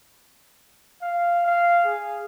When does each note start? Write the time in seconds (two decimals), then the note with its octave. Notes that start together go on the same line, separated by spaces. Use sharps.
1.02 F5
1.46 F5
1.86 G#4